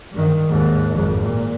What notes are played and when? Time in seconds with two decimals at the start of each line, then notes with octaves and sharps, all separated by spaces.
0.12 G2 D#3
0.46 D#2 G#2
0.92 G#1 F2
1.22 A#2